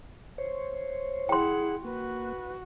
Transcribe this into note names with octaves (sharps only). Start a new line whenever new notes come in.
C5 C#5
E4 G#4 F#5 G5 C6
A#3 F#4 B4